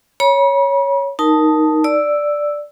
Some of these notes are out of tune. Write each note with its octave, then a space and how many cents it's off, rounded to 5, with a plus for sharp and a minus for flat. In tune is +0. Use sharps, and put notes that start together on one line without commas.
C#5 +0 B5 -45
D#4 +0 A#4 +5 A5 +0
D5 +0 E6 +0